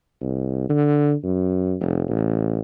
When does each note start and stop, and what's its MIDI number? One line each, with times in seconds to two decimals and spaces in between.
0.21 0.67 36
0.69 1.14 50
1.24 1.76 42
1.81 2.04 29
2.09 2.61 33